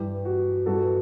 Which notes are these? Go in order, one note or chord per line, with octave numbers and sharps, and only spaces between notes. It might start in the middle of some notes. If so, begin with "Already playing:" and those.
Already playing: G2 E3 G4
F#4
G2 E3 F#4 A4